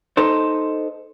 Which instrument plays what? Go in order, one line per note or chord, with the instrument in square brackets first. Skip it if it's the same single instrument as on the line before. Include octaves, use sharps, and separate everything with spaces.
[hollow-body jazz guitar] D#4 A4 C5